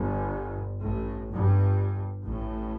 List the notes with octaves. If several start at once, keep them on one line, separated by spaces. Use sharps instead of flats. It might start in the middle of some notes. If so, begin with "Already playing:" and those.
Already playing: G1 G2
A1 A2
G1 G2
A1 A2